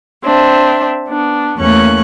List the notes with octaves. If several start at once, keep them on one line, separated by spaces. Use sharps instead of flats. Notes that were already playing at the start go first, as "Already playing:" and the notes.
C4 D4 E5
B3 D4
E2 A3 A#3 C#4 C#6 F#6